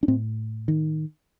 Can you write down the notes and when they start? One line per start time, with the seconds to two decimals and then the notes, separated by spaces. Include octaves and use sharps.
0.03 D4
0.08 A2 C4
0.68 D#3